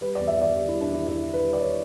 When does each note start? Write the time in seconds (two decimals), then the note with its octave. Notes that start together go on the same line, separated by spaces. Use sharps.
0.01 G3 B4
0.15 D5
0.19 E2
0.27 E5
0.36 E2
0.42 D5
0.55 D3 G4
0.68 E4
0.72 G3
0.81 D4
0.90 E2 E4
1.08 E2 E4
1.25 D3
1.33 B4
1.43 G3
1.53 D5
1.61 C#5